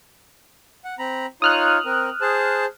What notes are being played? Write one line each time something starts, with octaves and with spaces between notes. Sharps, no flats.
F#5
C4 A#5 B5
D#4 F4 C#5 D#6 F6 F#6
C4 A#4
G#4 C5 A5